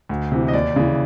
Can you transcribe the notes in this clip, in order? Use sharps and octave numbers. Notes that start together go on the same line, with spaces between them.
D2
C3 E3
D#5
D#2 D5
C#3 E3